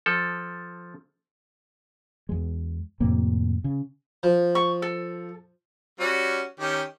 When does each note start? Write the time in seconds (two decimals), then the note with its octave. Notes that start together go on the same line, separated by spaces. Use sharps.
0.06 F3 A4
2.29 E2 G#3
3.00 F2 A2 C3 A#3
3.64 C#3
4.23 F3
4.55 C#6
4.82 A4
6.00 G3 C#4 F#4
6.60 D#3 C#4 G4